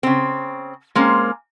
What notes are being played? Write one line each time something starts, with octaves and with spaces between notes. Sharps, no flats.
C#3 C4
G#3 A#3 C4 C#4